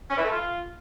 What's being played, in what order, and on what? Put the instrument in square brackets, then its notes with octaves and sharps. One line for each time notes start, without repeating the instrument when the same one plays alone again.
[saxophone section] C#4
E3
A3
F4